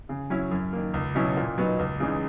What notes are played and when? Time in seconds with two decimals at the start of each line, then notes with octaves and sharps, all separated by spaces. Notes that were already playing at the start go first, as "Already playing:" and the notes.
0.09 C#3
0.30 F#3 C#4 E4
0.51 F#2
0.73 D#3 A#3
0.94 C#2
1.15 B2 F#3 C#4 E4
1.37 A#2
1.58 F#3 B3 D#4
1.79 C#2
2.00 C#3 E3 G#3 D#4